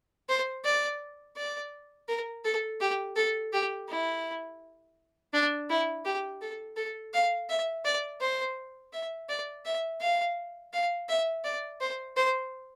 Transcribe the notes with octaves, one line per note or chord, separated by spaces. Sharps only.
C5
D5
D5
A#4
A4
G4
A4
G4
E4
D4
E4
G4
A4
A4
F5
E5
D5
C5
E5
D5
E5
F5
F5
E5
D5
C5
C5